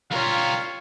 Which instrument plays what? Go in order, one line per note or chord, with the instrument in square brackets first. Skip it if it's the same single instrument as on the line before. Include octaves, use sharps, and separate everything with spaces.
[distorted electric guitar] G3 A#4 [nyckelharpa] F4 C#5 [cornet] F5